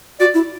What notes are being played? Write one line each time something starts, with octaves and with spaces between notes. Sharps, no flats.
F#4 D5
E4